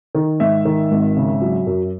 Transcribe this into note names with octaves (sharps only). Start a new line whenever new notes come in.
D#3
G#2 E5
D#3
G#1
C#3
F#3
F#2